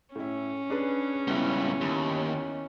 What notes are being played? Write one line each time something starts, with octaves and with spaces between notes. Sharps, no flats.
A2 C#4 E4
D4 G#4 B4
C#2 G3 B3 E4
D#2